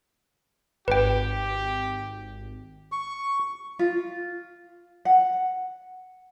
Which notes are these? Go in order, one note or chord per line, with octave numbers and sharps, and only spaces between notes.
G#1 G4 B4 G5
C#6
F4
F#5